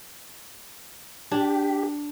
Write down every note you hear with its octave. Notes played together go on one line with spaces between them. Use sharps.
D4 G4